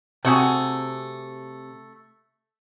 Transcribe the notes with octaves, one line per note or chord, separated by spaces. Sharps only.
C3 A3 F#4 G#4